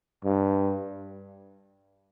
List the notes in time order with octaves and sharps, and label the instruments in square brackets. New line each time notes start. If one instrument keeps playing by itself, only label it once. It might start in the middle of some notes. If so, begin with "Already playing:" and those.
[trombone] G2